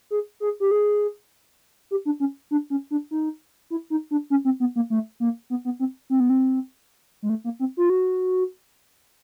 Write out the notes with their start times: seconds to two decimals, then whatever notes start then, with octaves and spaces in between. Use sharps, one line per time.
0.11 G#4
0.40 G#4
0.60 G4
0.71 G#4
1.91 G4
2.05 D4
2.20 C#4
2.51 D4
2.70 C#4
2.91 D4
3.11 D#4
3.70 E4
3.90 D#4
4.11 D4
4.30 C#4
4.45 C4
4.60 B3
4.76 A#3
4.90 A3
5.20 A#3
5.50 B3
5.65 B3
5.79 C4
6.10 C4
6.20 B3
6.30 C4
7.23 G#3
7.30 A3
7.44 A#3
7.60 C4
7.77 F4
7.90 F#4